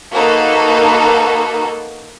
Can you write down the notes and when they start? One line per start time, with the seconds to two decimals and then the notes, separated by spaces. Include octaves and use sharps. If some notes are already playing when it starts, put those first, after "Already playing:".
0.15 A#3 D#4 F#4 A4 B4